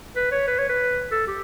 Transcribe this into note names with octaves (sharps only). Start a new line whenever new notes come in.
B4
C#5
B4
C#5
B4
A4
G4